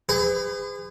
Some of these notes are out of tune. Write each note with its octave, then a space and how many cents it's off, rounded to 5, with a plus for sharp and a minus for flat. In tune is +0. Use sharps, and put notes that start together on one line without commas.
G#4 -30 B4 +45